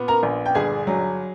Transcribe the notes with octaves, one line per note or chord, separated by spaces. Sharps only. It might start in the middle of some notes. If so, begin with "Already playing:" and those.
Already playing: A#2 B3
A#4 A#5
A#1
G5
G1 G#4 G#5
F#3